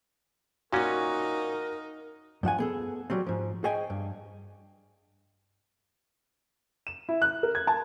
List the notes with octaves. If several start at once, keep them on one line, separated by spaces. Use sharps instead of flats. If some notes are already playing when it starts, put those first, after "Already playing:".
A#2 C#4 D#4 F#4 A#4
G2 F3 F#5 G#5
B3 G#4 A4
F#3 G3 C4
G#2 F3
G#4 C5 C#5 D#5 G5 G#5
G2
E7
E4
F#6
A#4
G#6
A5